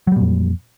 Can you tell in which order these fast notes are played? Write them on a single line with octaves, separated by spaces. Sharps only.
F#3 G3 A#2 F2